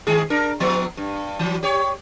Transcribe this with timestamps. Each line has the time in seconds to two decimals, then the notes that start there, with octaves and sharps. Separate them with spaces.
0.07 D#3 G#3 G#4
0.30 D4 A#4
0.60 F3 B3
0.97 G2
1.39 E3 F#3
1.63 G4 C#5